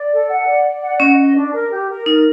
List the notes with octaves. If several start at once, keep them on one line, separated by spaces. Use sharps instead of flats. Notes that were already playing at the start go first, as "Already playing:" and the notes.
Already playing: D5
A4
F#5
D5
D5
F#5
C#4 D#5
D#5
D4
A#4
G4
A#4
D#4 A#4